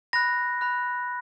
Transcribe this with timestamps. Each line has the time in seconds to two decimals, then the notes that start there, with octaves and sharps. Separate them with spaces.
0.13 B5 F#6 A#6
0.61 B5 F#6